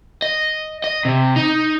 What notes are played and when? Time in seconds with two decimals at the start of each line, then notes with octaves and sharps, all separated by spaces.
0.22 D#5
0.84 D#5
1.05 C3
1.36 D#4